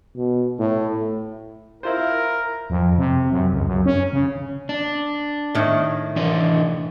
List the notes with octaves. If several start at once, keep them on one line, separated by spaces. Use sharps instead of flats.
B2
A2
E4 F4 A#4 C5
F2
C3
F#2
C#2
F#2
C#4
C#3
D4
A2 D#3
E3 D4 D5